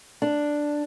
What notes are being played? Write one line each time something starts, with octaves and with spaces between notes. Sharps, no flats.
D4